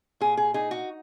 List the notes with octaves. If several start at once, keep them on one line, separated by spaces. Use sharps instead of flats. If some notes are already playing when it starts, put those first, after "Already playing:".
A#2 G#4
G#4
D#4 G#4
F#4